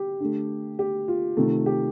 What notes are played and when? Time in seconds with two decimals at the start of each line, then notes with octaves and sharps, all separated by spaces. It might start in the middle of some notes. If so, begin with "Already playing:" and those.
Already playing: G4
0.20 D3 A3
0.79 G4
1.08 F4
1.37 C3 D#3 A3
1.66 G4